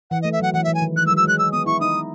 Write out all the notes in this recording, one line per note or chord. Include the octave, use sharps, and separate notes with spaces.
E3 F#5
A3 D#5
E5
F#3 F#5
E3 F#5
E3 E5
G#5
D#3
E3 F#6
G#3 E6
F#3
E6
G#3 F#6
E6
B3 D#6
E4 C#6
D#4 D#6